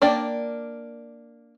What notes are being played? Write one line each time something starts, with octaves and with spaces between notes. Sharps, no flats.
A#3 D4 D5 G5